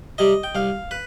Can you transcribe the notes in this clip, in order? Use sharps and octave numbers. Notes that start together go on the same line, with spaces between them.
C3 G3 D#5
G5
C2 F5
B4